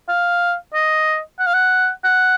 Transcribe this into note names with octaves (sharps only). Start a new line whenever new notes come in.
F5
D#5
F#5
F5
F#5
F#5